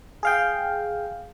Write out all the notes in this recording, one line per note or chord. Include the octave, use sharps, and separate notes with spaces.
G#4 F5 G5